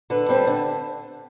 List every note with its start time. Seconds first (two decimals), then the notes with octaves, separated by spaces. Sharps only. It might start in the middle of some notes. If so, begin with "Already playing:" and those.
0.10 D3 A4 B4
0.29 G3 C4
0.47 D3